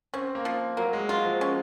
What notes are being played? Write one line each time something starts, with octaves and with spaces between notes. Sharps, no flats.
C4 C#4
A#3
F3
F#3 A#3
G#3
F#3 F4
F3
C#4